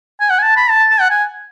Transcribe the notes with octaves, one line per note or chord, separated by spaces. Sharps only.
G#5
F#5
G#5
A5
B5
A5
A5
F#5
G#5